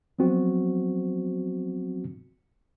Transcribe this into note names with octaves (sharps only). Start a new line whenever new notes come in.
F3 F#3 B3 C4 F#4